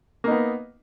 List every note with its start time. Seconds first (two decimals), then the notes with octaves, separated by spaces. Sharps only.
0.24 A#3
0.27 D#4
0.31 B3